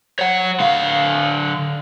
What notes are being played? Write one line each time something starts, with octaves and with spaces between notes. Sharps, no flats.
C#5 F#5
D3 F5